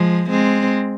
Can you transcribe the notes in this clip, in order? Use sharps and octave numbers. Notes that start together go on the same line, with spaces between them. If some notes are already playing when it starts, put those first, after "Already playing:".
Already playing: F3 G#3
G#3 C4